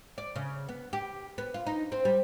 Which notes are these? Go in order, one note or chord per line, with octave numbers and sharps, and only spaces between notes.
D5
C#3
B3
G4
B3
F4
D#4
C4
G3